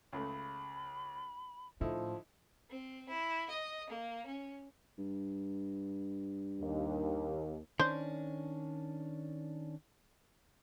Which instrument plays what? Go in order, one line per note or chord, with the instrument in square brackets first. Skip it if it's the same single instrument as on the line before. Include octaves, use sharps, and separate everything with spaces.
[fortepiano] C#2 C#3 A3 [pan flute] B5
[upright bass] A2 [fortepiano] D3 D#4 E4 [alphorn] F3
[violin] C4
E4
D#5
A#3
C#4
[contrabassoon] G2
[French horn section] D#2
[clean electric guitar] D#3 C#4 D4 [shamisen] C5